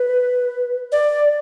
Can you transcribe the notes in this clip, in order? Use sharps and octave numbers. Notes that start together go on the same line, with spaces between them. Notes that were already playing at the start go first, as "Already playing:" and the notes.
Already playing: B4
D5